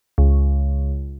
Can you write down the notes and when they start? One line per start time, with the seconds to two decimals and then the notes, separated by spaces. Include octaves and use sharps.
0.18 C#2